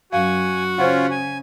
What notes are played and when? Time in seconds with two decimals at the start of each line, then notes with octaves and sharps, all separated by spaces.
0.13 F#2 F#4 F5 G#5
0.78 C#3 C#4 F4 C5 F#5
1.11 G#5